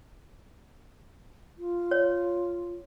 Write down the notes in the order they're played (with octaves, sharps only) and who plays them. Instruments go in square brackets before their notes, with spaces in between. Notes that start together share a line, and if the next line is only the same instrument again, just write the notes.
[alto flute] F4
[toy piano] C#5